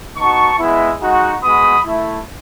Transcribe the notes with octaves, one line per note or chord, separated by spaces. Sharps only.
B3 D#4 F#4 A5 C#6
G#3 B3 E4
G#3 D#4 F#4
G#3 B3 F#4 B5 D#6
A3 E4